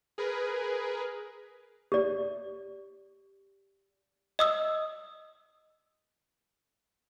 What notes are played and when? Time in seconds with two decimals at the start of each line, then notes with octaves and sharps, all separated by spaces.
0.18 G#4 A#4 B4
1.92 G4 D5
4.39 D#5 D#6 E6